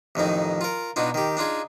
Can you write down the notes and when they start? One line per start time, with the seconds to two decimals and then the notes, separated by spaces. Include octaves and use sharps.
0.15 A1 F2 D#3 D#4
0.61 F4 A#4
0.96 B2 D4 D#4 F4
1.14 D#3 G4
1.37 D4 D#4 F4 G#4